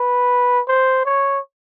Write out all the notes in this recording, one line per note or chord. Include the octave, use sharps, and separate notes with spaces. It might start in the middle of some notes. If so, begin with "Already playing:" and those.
Already playing: B4
C5
C#5